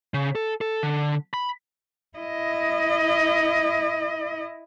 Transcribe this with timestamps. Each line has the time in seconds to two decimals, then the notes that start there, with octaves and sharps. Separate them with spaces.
0.14 C#3
0.35 A4
0.61 A4
0.83 D3
1.34 B5
2.18 E4 D#5